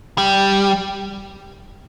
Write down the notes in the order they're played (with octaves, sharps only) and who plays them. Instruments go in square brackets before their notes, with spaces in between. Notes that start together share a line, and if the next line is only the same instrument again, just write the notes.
[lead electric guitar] G3